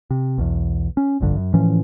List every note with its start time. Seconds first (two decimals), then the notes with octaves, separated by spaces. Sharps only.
0.11 C3
0.38 B1 E2
0.97 C#4
1.20 F1 A#1 G2 D3
1.36 F#2
1.54 A2 E3 F3 C#4